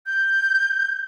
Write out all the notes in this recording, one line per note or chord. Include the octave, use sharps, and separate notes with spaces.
G6